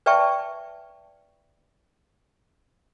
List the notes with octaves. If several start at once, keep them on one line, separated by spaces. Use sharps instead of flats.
B4 D5 E5 G5 A5 C#6